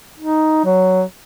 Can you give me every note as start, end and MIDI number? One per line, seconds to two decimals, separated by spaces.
0.19 0.61 63
0.65 1.03 54